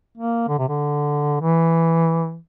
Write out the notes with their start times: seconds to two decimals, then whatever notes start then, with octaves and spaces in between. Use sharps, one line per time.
0.18 A#3
0.48 D3
0.59 C3
0.68 D3
1.41 E3